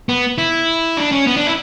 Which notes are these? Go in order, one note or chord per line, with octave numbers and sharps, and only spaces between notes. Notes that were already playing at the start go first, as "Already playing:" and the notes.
B3
E4
D4
C#4
B3
D4
E4